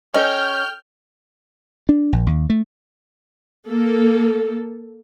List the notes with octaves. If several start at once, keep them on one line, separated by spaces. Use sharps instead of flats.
C#4 A4 D#5 G5 G#5 F6 G6
D4
A#1
D#2
A3
A#3 A4